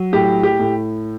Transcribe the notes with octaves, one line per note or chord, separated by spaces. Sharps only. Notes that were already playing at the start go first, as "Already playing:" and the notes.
Already playing: F#3
A2 G4
G4
A2